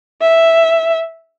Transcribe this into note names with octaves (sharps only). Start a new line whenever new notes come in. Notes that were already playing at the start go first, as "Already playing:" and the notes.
E5